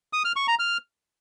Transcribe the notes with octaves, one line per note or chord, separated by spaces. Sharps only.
D#6
F6
C#6
A#5
F6